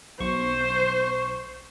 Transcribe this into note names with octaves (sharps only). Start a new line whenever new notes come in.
B1 C5 C#6